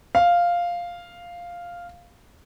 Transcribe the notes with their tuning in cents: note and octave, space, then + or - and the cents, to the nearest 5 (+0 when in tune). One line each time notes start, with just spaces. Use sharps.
F5 +0